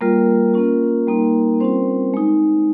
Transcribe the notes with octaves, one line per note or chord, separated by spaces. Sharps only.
G3 A#3 F4 A#4
A#3 C#4 F4
G3 A#3 D#4
G3 C4 C#4 F4 C5
G#3 D#4